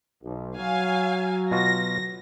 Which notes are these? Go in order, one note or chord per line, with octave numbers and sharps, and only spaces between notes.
B1
F#3 F5 G#5
B2 F4 F#4 A#6